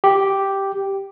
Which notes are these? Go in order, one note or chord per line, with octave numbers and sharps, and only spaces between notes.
G4